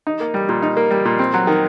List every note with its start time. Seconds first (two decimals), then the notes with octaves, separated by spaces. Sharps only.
0.07 D#4
0.20 A#3
0.34 G3
0.49 A#2
0.62 D#4
0.77 A#3
0.91 G3
1.05 A#2
1.19 C4
1.34 F#3
1.47 D#3